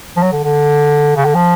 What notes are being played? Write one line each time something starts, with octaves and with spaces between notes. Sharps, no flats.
F3
F#3
D3
D3
C#3
D3
F3